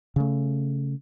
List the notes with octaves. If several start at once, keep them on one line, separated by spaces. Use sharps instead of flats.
C#3 A3